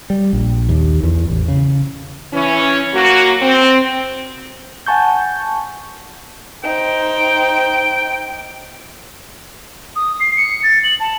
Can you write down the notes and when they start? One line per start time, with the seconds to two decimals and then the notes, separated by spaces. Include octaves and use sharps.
0.10 G3
0.33 A#1
0.69 D#2
1.03 E2
1.30 A1
1.48 C#3
2.33 E3 C#4
2.94 F#3 A#3 F#4
3.42 C4
4.86 F#5 G#5 A5 C#6 G6
6.63 D#4 C5 G5
9.96 D#6
10.20 C7
10.37 C#7
10.63 A6
10.84 F#7
11.00 A5